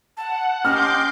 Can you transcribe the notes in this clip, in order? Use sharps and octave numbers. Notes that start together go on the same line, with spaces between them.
F#5 A5
C#4 G4 D#5 C6 D6 F6 G6